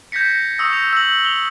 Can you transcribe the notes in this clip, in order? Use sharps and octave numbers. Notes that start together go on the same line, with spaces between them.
G6 G#6 A#6 B6 C#7
C#6 D#6 E6 A#6
F7
E6 A#6 F#7
F7 G7